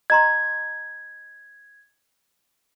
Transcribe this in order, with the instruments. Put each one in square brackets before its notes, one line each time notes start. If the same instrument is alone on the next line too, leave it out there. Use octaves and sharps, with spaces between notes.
[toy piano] D#5 A#5 C6 [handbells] G#6